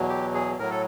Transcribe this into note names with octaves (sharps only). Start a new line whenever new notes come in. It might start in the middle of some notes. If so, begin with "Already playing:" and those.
Already playing: E2 B2 F#3
G4
G#4
A2 F#3 A#4
A4